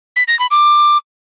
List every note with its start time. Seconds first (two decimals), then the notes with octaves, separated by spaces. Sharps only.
0.16 B6
0.28 A#6
0.39 B5
0.51 D6